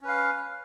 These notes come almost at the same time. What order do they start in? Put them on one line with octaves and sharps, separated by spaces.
C#4 B4 F5